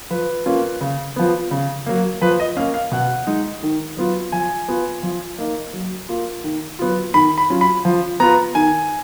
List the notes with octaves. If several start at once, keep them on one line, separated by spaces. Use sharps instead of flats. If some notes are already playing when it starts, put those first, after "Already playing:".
F3 B4
A#3 C#4 F4
C#3
F3 B3
C#3
F#3 A#3
F3 B4
D#5
A#3 C#4 F5
F5
B2 F#5
G#3 D#4
D#3
F#3 B3 F4
F3 G#5
B3 F4
F3
A#3 D#4
F#3
A#3 F4
D#3
F#3 B3 F4
D#3 B5
B5
F#3 C#4 F4
B5
F3
B3 F4 A#5
D#3 G#5